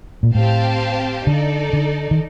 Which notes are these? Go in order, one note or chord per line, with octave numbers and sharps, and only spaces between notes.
A#2
A2 C4 G4 C5 F5 A5
D3 D#4 A4 D5
D3
D#3